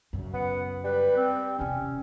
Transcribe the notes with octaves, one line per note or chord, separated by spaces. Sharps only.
F#2 C#3
B3 F#5
G3 B4
C4
E2 C3 C#4